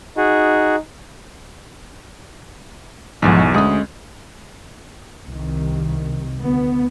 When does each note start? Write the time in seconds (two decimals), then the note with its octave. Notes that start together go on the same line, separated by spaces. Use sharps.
0.17 D#4 F#4 G#4
3.22 B1 E2 G#2 F3 F#4
3.54 D2 G#3 C#4 D#6
5.24 C2 C3 D#3
6.39 D2 B3